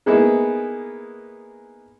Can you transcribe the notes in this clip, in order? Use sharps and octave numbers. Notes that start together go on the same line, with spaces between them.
G#3 A#3 B3 D#4 E4 G#4